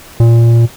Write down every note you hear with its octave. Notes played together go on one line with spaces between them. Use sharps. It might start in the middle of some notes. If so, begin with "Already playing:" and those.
A#2